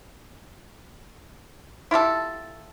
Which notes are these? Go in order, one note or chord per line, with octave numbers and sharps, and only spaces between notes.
E4 F4 G4 A4